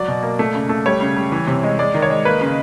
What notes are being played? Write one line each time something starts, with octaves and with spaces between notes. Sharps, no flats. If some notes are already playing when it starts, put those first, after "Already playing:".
Already playing: F#3 D5
B2
A#3
A3
C#3
A3
G3 C#5
C#3
G3
E3
C3
G#3
G#3 D5
D#3
C#5
G#3
A#3 B4
C#3